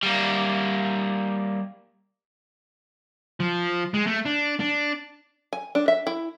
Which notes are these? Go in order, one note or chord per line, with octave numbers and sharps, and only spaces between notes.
G3 A#3
F3
G#3
A3
D4
D4
G#5
D4
E5
E4